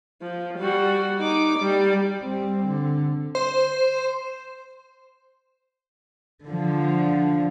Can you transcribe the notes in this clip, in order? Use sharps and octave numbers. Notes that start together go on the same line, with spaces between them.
F3
G3 F#4
D#4 D6
G3
G3 C4
D3
C5
D3 F3